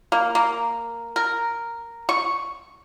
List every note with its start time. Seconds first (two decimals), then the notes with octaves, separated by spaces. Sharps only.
0.12 A#3
0.35 A#3
1.16 A#4
2.09 C#6